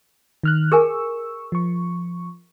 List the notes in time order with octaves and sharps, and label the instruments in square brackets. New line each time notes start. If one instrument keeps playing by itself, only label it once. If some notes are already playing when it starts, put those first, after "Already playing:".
[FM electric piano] D#3 F6 F#6
[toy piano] G#4 A#4 G#5 [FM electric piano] C#6 E6
[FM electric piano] F3 C#6